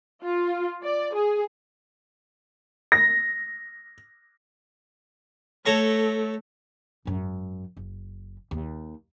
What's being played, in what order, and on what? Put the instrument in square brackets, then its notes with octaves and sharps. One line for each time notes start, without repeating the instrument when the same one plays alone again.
[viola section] F4
D5
G#4
[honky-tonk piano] A#6
[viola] A3 [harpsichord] A4 C#5 A#5
[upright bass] G#1 F#2
F#1
D#2